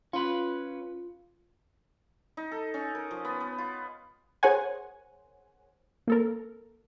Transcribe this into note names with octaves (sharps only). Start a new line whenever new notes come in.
C#4 F4 B4
D#4
A4
C#4
A#4
F3
B3
B3
F4
G#4 A#4 C5 C#5 F#5 G#5
A#3 A4 A#4